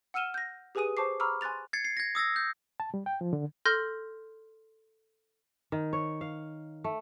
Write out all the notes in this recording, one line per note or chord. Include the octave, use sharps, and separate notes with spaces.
F#5 E6 F6 D#7 E7 G7
G6 A#6
G4 G#4 B4 G#5 D#6 D#7
C5 A5 C#6 D6 C7
A#5 B5 C#6 D6 E6 F6
G#5 C6 F#6 A6 F7
G#6 A6 C7 C#7
C7
G#6 A#6
D#6 E6 A6 A#6
G6
A5
G3
G5
F3
D3
A4 C6 F6 G6 A#6
D#3
C#5
F5
A3